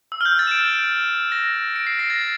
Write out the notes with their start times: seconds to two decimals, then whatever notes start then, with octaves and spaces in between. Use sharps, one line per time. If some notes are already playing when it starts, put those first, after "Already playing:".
0.12 E6
0.21 F6
0.25 G6
0.39 A6
0.47 E7
0.51 D7
1.32 A#6
1.76 D7
1.87 C7
1.99 A#6
2.10 A6